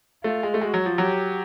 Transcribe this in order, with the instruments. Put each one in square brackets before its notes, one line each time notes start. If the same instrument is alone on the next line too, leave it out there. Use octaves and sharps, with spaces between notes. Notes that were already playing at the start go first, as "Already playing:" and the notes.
[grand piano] A3 [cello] F4
[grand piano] G#3
A3
[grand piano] G#3 [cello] F#4
[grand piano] F#3
F3
[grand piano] F#3 [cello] G4